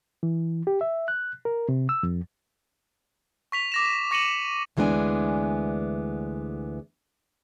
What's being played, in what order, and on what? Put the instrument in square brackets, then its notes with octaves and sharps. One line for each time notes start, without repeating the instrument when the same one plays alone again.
[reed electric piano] E3
G4
E5
F#6
A#4
C3
E6
F2
[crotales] C#6 B6 F7
D6 A#6 E7
C#6 A#6 C#7 D#7 E7 F#7
[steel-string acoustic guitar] D2 E3 G#3 B3 D4 G#5